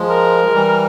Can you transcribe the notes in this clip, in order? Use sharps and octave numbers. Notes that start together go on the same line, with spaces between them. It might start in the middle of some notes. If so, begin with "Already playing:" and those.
Already playing: F3 G#3
A#4
G#3
E3 G3